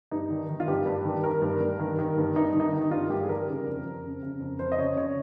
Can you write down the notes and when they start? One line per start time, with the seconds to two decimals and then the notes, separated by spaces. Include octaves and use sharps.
0.11 G2 D#4
0.30 D#3
0.49 D#3
0.60 F4
0.67 G2 G4
0.86 G2
1.05 D#3
1.23 D#3 A#4
1.42 G2
1.61 G2
1.79 D#3
1.99 D#3
2.17 G2
2.36 G2 D#4
2.54 D#3
2.60 D#4
2.73 D#3
2.82 D#4
2.91 G2 F4
3.10 G2 G4
3.23 G#4
3.28 D#3 A#4
3.47 C#3
3.66 F2
3.84 F2
4.04 C#3
4.23 C#3
4.40 F2
4.59 F2 C5
4.72 D#5
4.78 C#3 C#5
4.96 C#3 C#5